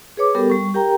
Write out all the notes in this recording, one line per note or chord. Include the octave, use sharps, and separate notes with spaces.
G#4 B4 C#5 D6
G3 B3 G4 A4 A#4
G3 C#6
G4 A#4 G5 A#5